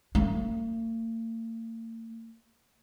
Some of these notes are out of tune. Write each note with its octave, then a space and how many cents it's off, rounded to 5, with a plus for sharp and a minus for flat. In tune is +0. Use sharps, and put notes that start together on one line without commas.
A#3 -45